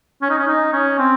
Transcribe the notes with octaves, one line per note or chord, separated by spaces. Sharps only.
C#4
D#4
C#4
D#4
C#4
C4